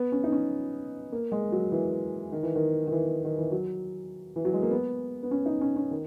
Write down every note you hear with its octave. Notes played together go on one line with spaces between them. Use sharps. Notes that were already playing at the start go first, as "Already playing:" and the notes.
Already playing: B3
C#4
D#4
C#4
A#3
G#3
F#3
E3
D#3
E3
D#3
D#3
E3
D#3
E3
F#3
E3
F#3
G#3
A#3
B3
B3
C#4
D#4
C#4
C#4
D#3